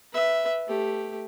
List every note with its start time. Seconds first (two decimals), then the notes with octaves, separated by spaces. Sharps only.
0.13 B4 E5
0.68 A3 G4